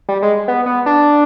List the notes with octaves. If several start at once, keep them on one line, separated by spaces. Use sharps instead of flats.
G3
G#3
B3
B3
D4